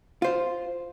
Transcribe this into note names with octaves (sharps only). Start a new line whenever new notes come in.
F4 C5